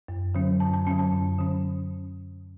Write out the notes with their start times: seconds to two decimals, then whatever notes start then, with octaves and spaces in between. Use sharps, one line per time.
0.08 F#2
0.35 D3 F#3 C#4
0.60 F#2 A5
0.74 A5
0.87 D3 F#3 C#4 A5
0.99 A5
1.12 F#2
1.38 D3 F#3 C#4